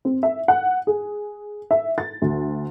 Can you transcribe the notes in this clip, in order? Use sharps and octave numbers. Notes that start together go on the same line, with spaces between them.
C4
E5
F#5
G#4
E5
A6
D2